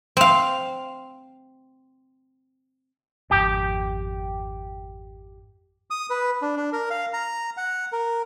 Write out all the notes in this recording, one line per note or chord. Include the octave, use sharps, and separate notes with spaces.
C4 F5
G#1 F2 G4
D#6
B4
D4
D4
A#4
F5
A#5
F#5
A#4